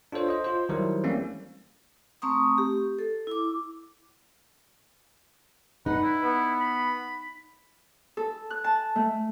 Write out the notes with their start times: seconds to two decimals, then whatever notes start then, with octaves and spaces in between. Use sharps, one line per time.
0.12 D4 F4 A4 C5 C#5
0.28 C5 D#5
0.44 F4 C5
0.69 D#3 F#3 G3 E4 A#4 C5
1.04 E3 G3 A3 A#3 C4 C#4
2.22 A3 C4 A#5 C#6 D#6
2.58 G4
2.99 A4
3.27 E4 D6
5.86 D#4 B4 F#5
6.03 E4
6.24 B3
6.60 B5
8.17 A4
8.50 F#6
8.64 A5
8.96 A3